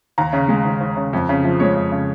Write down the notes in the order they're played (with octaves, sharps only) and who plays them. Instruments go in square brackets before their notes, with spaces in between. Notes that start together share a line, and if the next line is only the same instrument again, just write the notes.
[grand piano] D#2 A#5
C#3
G#3
D#2
D#2
C#3
F2
C#3
F3
G#3 C#5
F2
C#3